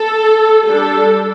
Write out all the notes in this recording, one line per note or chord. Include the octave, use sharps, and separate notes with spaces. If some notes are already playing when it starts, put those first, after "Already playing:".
Already playing: A4
G3 A4
D4